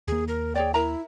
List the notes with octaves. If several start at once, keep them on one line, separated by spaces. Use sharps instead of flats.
D#2 A#3 G#4
A#4
G#4 C#5 D5 G5
E4 A#4 E5 A#5